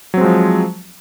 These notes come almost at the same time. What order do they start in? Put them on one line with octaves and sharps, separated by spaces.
F#3 C4 G#3 F3